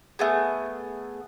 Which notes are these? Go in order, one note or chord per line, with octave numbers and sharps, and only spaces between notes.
A3 B3 G#4